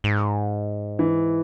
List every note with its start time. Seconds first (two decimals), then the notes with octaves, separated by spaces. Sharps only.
0.04 G#2
0.99 E3